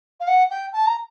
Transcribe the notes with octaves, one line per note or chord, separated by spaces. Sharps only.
F5
F#5
G5
A5
A#5